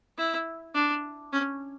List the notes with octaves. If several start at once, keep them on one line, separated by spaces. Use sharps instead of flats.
E4
D4
C#4